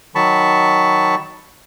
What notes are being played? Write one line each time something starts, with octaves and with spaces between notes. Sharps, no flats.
D#3 F#3 A5 B5 C#6